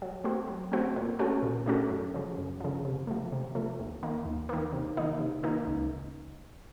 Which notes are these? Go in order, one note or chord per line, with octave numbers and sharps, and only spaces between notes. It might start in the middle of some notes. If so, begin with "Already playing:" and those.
F#3
A3 C4 F#4
F#3
A3 C4 F#4
A#2
A3 C#4 F#4 A4
A#2
A3 C#4 F#4 A4
F#2
C#3 F3
F#2
C#3 F3
C3
F3 A3
C3
F3 A3
D#2
D#3 A#3
D#2
D#3 A#3
C3
D#3 A#3 D#4
C3
D#3 A#3 D#4
C#2